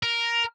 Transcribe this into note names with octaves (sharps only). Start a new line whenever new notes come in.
A#4